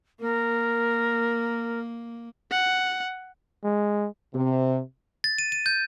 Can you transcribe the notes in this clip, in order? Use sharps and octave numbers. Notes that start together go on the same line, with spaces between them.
A#3 A#4
F#5
G#3
C3
A6
D#7
D#7
G6